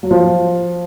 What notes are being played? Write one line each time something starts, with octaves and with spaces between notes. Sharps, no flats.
F#3
F3